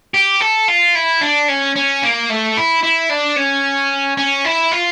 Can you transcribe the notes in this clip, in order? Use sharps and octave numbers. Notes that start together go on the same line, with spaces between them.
G4
A4
F4
E4
D4
C#4
C#4
A#3
A3
E4
E4
D4
C#4
C#4
E4
F4